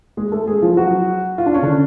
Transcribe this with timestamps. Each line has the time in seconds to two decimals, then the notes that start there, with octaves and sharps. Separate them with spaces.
0.17 G#3 G#4
0.32 A3 A4
0.47 G#3 G#4
0.62 F3 F4
0.77 F#3 F#4
1.38 F4
1.46 D4
1.54 C#4
1.63 D3 D4